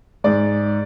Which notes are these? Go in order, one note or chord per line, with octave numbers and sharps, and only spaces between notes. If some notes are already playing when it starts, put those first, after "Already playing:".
G#2 G#3 D5